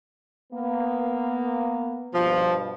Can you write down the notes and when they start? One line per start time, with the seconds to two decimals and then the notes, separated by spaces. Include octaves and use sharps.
0.53 A#3 B3
2.14 G2 B2 F3